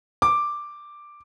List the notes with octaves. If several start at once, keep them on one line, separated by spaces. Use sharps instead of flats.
D6